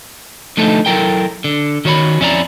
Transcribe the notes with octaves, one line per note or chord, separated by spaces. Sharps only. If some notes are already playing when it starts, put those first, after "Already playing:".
D3 F3 A3 D#4 A4
F#3 E4 A4 A#4 G5
D3
D#3 F#4 C#5 D#5 B5
F2 C#4 E4 F4 D5 A#5